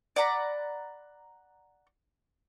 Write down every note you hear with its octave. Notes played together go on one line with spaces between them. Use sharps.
D5 F#5 A#5 B5